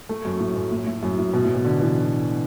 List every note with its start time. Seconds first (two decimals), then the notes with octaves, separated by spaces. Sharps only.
0.09 A3
0.25 F#2
0.40 A2
0.56 F#2
0.71 A2
0.87 A2
1.03 F#2
1.18 A2
1.34 B2
1.44 A2
1.55 B2
1.64 D3
1.81 E3